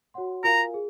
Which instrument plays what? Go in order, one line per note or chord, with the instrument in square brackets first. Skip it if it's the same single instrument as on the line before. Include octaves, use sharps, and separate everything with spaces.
[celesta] F#4 C#5 F#5 C6
[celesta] F4 A#4 F5 G#5 [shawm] A#5
[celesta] G#4